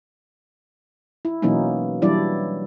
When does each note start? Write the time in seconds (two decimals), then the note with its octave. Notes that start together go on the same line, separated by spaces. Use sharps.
1.25 E4
1.42 B2 E3 F#3 A#3 C#4 D#4
2.02 E3 F#3 G3 D4 E4 D5